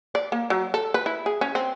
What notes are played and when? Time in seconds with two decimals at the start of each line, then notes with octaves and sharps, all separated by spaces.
0.15 D5
0.32 A#3
0.50 F#3
0.74 A4
0.94 B4
1.06 E4
1.26 G#4
1.41 C#4
1.55 C4